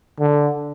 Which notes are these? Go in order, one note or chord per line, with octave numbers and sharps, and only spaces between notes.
D3